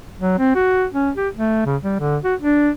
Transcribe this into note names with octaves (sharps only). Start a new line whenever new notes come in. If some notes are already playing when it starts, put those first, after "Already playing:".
F#3
C4
F#4
C#4
G4
A3
C#3
G3
D3
F#4
D4